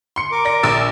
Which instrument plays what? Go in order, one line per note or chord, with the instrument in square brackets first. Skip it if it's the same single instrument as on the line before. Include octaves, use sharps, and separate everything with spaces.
[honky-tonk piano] C6 C#7
[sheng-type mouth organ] A#4 D6
[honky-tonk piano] D5 A#6
A#1 E6 A6